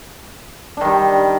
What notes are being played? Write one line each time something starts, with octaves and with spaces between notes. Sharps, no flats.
D#3 G3 D4